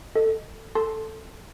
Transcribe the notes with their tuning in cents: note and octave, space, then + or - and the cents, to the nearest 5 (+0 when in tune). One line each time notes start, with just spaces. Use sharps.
A4 +10 D#5 +0
A4 +0 A5 +0 C6 +0